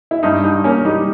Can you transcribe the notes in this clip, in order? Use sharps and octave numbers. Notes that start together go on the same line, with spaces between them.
E4
G2 D#4
G2 D#4
A#3 C#4
G3 D#4